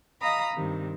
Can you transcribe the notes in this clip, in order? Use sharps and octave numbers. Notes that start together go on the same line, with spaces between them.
D#5 F5 A#5 B5 D#6
G2 C3 D#3